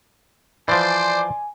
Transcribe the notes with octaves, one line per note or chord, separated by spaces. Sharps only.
E3 F3 C5 D5 G#5 C6 D6